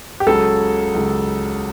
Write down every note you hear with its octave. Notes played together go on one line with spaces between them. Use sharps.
G4
C#2 C#3 F#3 A4
C#2 C#3 F#3